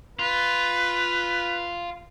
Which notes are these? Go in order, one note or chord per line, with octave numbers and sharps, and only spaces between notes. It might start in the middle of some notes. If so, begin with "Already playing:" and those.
F4 B4